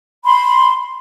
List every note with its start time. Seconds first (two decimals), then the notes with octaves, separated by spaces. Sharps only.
0.25 B5 C6